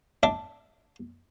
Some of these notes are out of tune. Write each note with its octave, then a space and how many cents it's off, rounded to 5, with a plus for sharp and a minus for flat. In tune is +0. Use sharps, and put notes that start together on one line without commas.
D4 +0 E5 -40